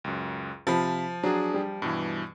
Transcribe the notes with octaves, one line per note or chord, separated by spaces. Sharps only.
C#2 F#2
C3 F3 F5 A5 B5
F#3 D4 G#4
G3
G2 B2 E3